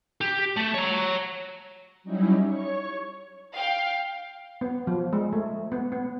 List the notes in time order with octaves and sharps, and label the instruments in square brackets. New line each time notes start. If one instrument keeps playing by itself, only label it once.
[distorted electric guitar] G4
A3
C#5 A#5
[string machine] F#3 G3 C#4 D#4 E4
C#5 C#6
[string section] F5 G5
[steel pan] B3
F3
G#3
A3
B3
B3